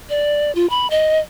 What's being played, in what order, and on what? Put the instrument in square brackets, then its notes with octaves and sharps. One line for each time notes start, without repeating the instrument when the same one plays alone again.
[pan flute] D5
F4
B5
D#5